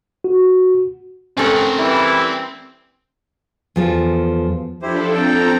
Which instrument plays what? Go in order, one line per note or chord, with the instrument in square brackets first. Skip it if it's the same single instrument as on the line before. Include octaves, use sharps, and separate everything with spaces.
[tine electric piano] F#4
[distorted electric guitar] C4 F#5 [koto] C#4 A4 A#4
[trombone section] E3 G3 E4
[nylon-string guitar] E2 F3 A4
[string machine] F3 D4 A4 [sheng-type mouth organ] E4 G4 C5
[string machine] C4 A#5 [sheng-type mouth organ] A4 G5